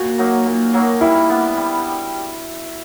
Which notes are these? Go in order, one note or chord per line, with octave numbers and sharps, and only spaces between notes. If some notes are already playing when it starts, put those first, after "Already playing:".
Already playing: A#2 F#4
F#3 A#3 D#4
A#2
F#3 A#3 D#4
G3 E4
B3 D4
G3